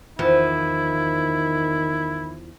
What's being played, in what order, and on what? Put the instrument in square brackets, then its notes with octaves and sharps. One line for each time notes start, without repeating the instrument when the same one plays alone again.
[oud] E2 F3 [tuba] D#3 [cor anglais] E4